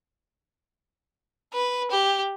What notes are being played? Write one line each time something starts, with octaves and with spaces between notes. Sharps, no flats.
B4
G4